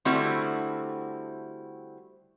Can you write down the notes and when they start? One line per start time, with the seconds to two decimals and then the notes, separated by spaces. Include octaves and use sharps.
0.05 D3 G3 A3 C4 E4 F#4